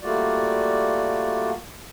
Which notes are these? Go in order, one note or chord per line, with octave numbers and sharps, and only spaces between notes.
G3 A3 A#3 F4 F#4 D5